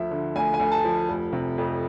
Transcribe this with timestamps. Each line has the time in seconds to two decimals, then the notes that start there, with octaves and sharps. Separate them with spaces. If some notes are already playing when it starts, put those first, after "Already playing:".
Already playing: D2 F3 E5
0.11 D3
0.36 D2 G#5
0.54 G#5
0.59 D2
0.72 A5
0.84 F3
1.08 F1
1.32 C3
1.58 F2